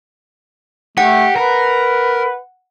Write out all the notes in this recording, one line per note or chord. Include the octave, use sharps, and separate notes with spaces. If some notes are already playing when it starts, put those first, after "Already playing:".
A3 G4 F#5
A#4 B4